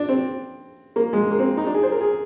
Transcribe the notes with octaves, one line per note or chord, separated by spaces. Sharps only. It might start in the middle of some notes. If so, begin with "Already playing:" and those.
Already playing: D4
C4
A#3
G#3
A#3
C4
D#4
D4
G#4
C5
A#4
G#4